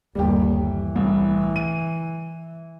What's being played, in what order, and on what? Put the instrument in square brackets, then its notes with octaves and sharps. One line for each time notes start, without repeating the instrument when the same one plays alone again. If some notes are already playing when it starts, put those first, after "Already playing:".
[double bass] G1 D#2 [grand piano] G3 G4
[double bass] E3
[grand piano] C2 A2
D#7